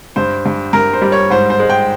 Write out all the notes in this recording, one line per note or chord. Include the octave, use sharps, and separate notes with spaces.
G2 C5
G2
G2 A#4
C5
G3
C#5
G#2 C5
C5
G#3
G5